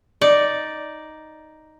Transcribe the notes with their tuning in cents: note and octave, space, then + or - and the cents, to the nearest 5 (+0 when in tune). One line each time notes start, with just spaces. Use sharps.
D#4 +0 D5 +0